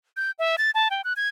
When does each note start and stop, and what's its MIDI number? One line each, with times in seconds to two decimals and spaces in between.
0.17 0.31 91
0.39 0.56 76
0.58 0.71 93
0.75 0.89 81
0.91 1.01 79
1.04 1.13 90
1.17 1.29 92